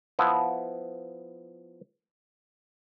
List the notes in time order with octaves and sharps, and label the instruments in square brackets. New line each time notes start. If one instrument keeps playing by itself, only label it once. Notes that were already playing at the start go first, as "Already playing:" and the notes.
[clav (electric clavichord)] F3 B3 E4